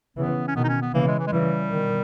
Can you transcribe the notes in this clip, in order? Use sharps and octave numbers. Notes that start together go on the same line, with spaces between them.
C#3 E3 B3
C#4
B2 D#3 B3
D#4
C#4
B3
C#3 E3 A#3
G#3
E3
G#3
C#3 E3 G3
B2 D#3